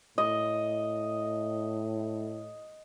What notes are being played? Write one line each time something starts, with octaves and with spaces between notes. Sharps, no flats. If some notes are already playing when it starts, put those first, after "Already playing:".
A2 D#5